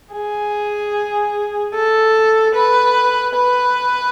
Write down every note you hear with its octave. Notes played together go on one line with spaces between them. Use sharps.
G#4
A4
B4
B4